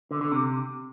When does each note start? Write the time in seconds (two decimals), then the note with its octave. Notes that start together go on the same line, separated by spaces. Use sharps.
0.11 D3
0.21 D3
0.32 C3